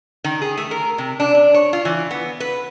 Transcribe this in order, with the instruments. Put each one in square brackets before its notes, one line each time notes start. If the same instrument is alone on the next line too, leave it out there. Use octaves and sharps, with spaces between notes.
[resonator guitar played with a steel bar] D#3
G#4
A3
A#4
C3
D4
D4
C#5
F4
E3
B3
B4